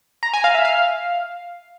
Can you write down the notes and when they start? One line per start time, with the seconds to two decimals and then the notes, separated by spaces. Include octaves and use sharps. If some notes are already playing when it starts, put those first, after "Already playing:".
0.23 A#5
0.34 G#5
0.44 F5
0.54 E5
0.65 F5